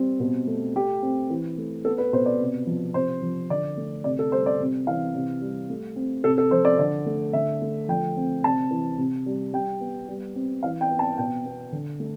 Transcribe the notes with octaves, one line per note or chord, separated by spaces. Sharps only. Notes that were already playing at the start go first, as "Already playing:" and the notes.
Already playing: G3 C4
B2
A3
A3 G4
C4
E3
A3
B3 A4
B4
B2 C5
D5
C3
F3
C3 C5
F3
D3 D5
A3
C3 D5
A4
G3 C5
D5
C3
E3 F5
C3
G3
A3
C4
C3 A4
A4
F3 C5
D5
D3 D5
A3
D3 E5
A3
F3 G5
C4
C3 A5
E3
C3
G3
G3 G5
B3
G3
C4
E3 F5
G5
B3
A5
B2 G5
B3
D3
A3